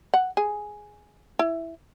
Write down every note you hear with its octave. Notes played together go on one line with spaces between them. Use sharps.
F#5
G#4
E4